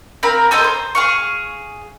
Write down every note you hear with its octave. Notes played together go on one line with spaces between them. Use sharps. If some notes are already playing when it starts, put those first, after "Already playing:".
C4 A#4 F5 B5
G#4 A4 C5 D#5
C5
G#4 F5 C#6